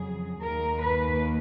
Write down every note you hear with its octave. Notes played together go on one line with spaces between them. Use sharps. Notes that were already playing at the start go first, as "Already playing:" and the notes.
Already playing: F2 C#3 F#3 G#4
D#2 D#3 A#3 A#4
B4